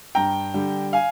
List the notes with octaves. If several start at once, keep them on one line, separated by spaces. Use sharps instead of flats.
G2 G5 A#5
D3 G3
F5 G#5